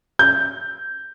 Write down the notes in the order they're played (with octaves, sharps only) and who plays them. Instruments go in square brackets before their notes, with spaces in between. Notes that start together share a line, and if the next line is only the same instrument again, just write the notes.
[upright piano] G6